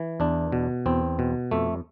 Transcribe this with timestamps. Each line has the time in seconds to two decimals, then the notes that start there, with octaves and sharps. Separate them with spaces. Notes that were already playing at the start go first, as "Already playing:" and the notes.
Already playing: E3
0.20 E2 D4
0.52 B2
0.86 E2 C4
1.19 B2
1.51 F2 A3